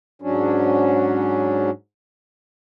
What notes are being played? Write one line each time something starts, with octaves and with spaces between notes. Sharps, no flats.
G#2 F#3 C#4 D4